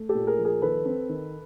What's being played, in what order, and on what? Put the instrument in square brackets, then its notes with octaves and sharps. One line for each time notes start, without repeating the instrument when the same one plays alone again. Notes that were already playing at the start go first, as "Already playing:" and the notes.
Already playing: [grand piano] A3
G4 A4
A#2
G#4 A#4
F3
G#4 A#4
D#3 A4 B4
C4
D#3